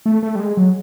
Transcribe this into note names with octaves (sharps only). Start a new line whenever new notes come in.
A3
A3
G3
G#3
F#3